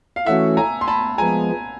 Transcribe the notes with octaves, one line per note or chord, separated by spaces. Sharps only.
F5
E3 A3 C#4 F#4 E5 F#5
G#5 A#5
C6
A5 B5
F3 G#3 B3 G#5 A#5